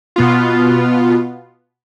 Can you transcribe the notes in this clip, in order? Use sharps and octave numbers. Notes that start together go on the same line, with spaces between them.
B2 B3 F4